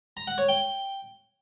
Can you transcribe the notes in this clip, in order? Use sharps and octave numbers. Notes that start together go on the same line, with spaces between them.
A#5
F#5
C#5
G5